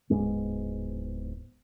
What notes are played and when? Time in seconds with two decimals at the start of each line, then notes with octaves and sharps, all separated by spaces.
0.10 D1 G#2 G#3 B3